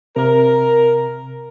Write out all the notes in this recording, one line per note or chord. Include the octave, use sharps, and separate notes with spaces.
C3 A#4